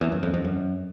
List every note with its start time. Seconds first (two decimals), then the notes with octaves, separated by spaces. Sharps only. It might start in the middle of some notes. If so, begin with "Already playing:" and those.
0.01 E2
0.12 F#2
0.23 F2
0.34 F2
0.44 F#2